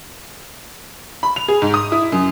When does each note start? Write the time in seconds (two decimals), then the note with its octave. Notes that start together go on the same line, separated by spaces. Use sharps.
1.23 B5
1.36 F7
1.48 G#4
1.62 G#2
1.74 D#6
1.92 E4
2.12 F#2